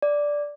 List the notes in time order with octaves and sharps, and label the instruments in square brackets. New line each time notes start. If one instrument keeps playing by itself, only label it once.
[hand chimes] D5